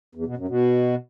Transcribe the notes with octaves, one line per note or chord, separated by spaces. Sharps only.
E2
B2
F#2
B2